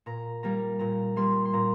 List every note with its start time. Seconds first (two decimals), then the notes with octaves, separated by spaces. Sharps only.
0.06 A#2 A#5
0.43 G3 A#3 A#5
0.79 A#2 A#5
1.16 G3 A#3 C6
1.45 C6
1.53 A#2 A#5